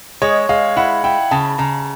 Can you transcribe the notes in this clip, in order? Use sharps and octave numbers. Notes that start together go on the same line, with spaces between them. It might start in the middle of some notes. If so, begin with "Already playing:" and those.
G#3 C#5
G#3 F5
E4 F#5
E4 G5
C#3 A5
C#3 A#5